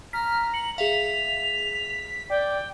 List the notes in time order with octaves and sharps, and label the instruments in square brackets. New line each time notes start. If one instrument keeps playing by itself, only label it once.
[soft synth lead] A#5 [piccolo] F6 [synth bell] B6
[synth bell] C#7 [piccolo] F#7
[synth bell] G#4 E5 F5 [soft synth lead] B6 [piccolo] F7
[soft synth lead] D5 [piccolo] G5